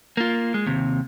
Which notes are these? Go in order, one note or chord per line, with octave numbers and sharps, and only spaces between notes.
A#3 F4
G#3
D#2 C3